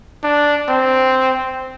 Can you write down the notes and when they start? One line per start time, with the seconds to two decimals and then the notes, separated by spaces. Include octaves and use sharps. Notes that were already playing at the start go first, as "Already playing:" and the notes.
0.24 D4
0.68 C4